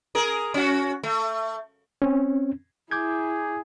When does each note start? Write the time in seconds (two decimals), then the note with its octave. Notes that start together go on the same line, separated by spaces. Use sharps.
0.15 G#4 A#4
0.54 C#4 F#4
1.03 A3
2.02 C4 C#4
2.91 E4 G#4 D6 G6 G#6